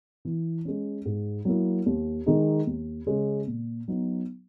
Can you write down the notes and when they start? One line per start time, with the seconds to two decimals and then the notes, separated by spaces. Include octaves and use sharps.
0.25 E3
0.65 G#3 C#4
1.05 G#2
1.45 F#3 A#3 E4
1.86 D#2
2.26 D#3 G#3 D#4
2.67 D#2
3.07 C#3 G#3 C#4
3.47 A#2
3.88 F#3 B3 D#4